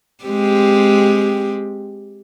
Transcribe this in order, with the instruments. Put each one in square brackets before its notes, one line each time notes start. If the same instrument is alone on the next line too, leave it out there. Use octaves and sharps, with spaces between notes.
[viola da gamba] G#3 C4 G4